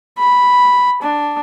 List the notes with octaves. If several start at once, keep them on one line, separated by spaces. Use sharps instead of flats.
B5
D4